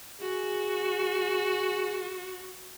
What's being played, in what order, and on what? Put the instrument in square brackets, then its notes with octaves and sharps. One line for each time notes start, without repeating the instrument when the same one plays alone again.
[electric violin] F#4 [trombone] G#4